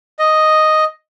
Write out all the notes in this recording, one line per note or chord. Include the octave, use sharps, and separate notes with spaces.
D#5